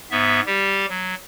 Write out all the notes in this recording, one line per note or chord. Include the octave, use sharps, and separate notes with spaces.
G#2 B3 E5
G3 G4
F#3